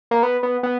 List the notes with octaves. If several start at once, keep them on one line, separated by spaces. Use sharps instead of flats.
A#3
B3
B3
B3